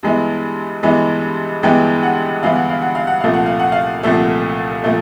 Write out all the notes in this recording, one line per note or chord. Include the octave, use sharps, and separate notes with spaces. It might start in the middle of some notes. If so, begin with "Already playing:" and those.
G2 E3 G#3 B3 E4
G2 E3 G#3 B3 E4
G2 E3 G#3 B3 E4 G5
F#5
G2 E3 G#3 B3 E4 F5
F#5
F5
F#5
F5
F#5
C2 A#2 F3 A3 F5
F#5
F5
F#5
F5
C2 A#2 F3 A3 E5
A#2 F3 A3